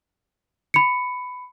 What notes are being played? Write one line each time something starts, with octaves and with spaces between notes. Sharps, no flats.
B5 C#7